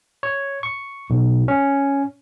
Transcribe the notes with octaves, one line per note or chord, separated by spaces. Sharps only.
C#5
C#6
B1
C#4